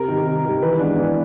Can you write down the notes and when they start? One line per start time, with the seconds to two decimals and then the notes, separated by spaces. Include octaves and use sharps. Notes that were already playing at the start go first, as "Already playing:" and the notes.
Already playing: C3 A#4
0.08 D#3 G3
0.26 C3
0.45 D#3 G3
0.62 E3 B4
0.79 G#3 B3 D4
0.98 E3